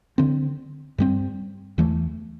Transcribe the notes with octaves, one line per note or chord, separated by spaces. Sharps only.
D3 C4
G2 G3 C4
E2 E3 A3